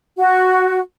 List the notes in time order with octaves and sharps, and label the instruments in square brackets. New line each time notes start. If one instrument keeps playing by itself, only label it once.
[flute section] F#4